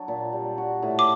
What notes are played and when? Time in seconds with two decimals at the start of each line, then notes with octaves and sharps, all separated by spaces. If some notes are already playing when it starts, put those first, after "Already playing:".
Already playing: F#3 D4
0.08 A#2
0.33 G3
0.58 F#4
0.83 A2
0.99 D6